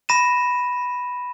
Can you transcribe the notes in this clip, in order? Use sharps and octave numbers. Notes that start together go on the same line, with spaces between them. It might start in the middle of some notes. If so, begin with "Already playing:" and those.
B5 A#6 D#7 E7